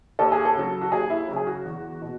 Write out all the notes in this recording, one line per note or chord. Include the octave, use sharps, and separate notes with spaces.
D#2 A4
G#4
A4
C#3 F#3
F#4
D#2 G#4
E4
C#3 F#3
G#4
F#4
E2
B2